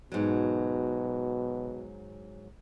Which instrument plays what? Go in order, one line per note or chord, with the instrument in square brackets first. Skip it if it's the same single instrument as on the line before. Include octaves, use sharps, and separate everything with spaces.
[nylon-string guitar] G#2 F#3 [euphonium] B2